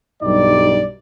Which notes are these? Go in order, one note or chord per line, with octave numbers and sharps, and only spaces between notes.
B1 G2 G3 D#4 D5